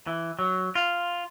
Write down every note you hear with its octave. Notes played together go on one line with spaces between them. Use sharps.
E3
F#3
F4